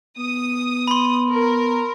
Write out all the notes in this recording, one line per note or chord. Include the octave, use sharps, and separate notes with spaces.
B3 D#6
B5 C6
A#4